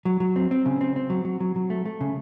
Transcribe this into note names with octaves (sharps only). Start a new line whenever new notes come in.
F#3
F#3
C4
C4
C#3
C4
C4
F#3
F#3
F#3
F#3
A3
A3
C#3